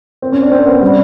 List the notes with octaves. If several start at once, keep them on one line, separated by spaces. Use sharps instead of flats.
C4
C#4
D4
C4
B3
G3